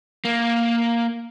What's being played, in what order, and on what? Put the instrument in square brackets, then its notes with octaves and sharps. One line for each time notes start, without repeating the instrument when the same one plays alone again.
[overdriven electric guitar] A#3